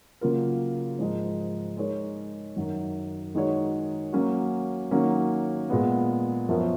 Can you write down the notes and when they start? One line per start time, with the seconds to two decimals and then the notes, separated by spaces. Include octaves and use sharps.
0.21 C#3 F#3 A#3 F4 A#4
0.99 G#2 F3 G#3 D#4 G#4
1.77 G#3 D#4 A#4 C#5
2.56 F#2 D#3 F#3
3.35 D#3 G#3 D#4 F#4 C#5
4.13 F#3 A#3 C#4 F#4
4.91 D#3 F#3 A#3 C#4
5.69 A#2 G#3 B3
6.49 F#2 F3 B3 F#4 A#4